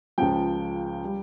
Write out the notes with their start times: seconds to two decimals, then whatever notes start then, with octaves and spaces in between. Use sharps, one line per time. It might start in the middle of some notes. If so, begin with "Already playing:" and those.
0.18 C#2 C#3 F3 G5
1.04 G3